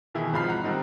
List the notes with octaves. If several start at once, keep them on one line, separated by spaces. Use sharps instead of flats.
B2 D#3 E3 E4 G#4
G#1 F3 G#3 B5 F6 C7
F#5 A#5 F#6
D#3 G3 C4 D#4